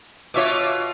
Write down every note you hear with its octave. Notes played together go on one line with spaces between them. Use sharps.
B2 F4 C#5 E5 D6